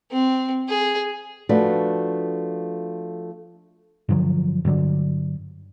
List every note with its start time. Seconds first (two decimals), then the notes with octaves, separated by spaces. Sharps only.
0.11 C4
0.68 G#4
1.49 F3 A3 D4 F#4 B4
4.09 G2 D3 F3 F#3
4.65 G2 D3 F#3 D4